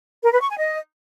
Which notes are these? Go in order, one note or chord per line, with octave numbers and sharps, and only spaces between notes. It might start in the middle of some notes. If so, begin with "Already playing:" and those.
A#4
B4
C#6
G#5
D#5